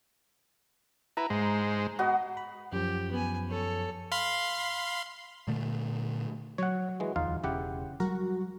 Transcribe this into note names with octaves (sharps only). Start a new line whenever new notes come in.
E4 B4 A#5
G#2 G#3 C5
B3 F#4 D#5
B5
F#2 F3 G4
B3 G#5
A4 C#5
F5 B5 C6
A#2 D3 A3
F#3 C#5 F#5
E3 G#3
D1 E2 D#4 F4 F5
E1 C#3 E4 G4 F#5
F#3 G3 F#4 A#4